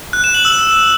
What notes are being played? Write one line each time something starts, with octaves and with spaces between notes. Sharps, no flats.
F#6
E7
F#7
E6